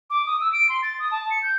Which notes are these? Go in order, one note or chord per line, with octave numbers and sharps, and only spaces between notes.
D6
D#6
E6
D7
C6
A6
D#6
A5
C#7
G6